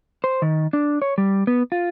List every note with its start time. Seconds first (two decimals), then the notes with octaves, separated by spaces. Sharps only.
0.24 C5
0.42 D#3
0.73 D4
1.02 C#5
1.18 G3
1.47 B3
1.72 F4